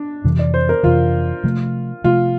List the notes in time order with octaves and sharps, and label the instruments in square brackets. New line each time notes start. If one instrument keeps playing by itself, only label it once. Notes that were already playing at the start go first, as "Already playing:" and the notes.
Already playing: [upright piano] D4
[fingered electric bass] F2 C3 E3
[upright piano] D5
C5
A#4
[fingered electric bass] F2 C3 E3 [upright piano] F4
[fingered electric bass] C3 F3 A3
[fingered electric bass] C3 F3 A3 [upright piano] F4